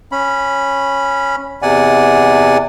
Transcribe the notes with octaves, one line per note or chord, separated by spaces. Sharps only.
C#4 B5
E2 C3 D5 F#5 G#5